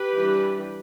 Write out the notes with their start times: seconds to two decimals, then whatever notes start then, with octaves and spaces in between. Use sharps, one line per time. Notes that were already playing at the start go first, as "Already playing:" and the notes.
Already playing: G4 B4
0.17 E3 G3 D4